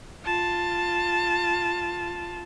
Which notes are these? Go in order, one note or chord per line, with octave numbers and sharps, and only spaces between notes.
F4 A5